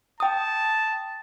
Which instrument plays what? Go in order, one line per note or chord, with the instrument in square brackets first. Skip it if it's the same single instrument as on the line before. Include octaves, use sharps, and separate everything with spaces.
[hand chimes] G5 D#6 [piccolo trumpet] A5